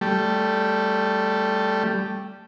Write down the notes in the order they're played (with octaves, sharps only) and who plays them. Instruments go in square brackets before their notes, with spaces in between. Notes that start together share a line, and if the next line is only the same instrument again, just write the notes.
[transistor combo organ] G3 A3